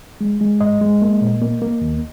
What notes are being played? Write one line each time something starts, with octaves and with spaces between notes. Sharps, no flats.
G#3
G#3
G#2 D#5
G#3
A#3
A#2
A#3
A#3
D#2